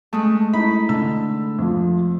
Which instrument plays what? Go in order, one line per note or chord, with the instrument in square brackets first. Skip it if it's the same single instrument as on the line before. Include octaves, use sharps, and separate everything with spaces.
[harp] G#3 A3 [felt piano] A5 D#6
[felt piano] D#4 E4 [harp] B5
[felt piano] D3 A5 E6
F2 F3